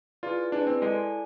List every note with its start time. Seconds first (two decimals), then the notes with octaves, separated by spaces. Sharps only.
0.23 E4 F4 G#4 B4 D5
0.52 D4 E4 G#4 B4 D5
0.67 C4
0.82 G#3 E4 A4 D5 G#5